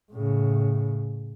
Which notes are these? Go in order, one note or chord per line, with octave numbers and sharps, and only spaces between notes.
A2 C#3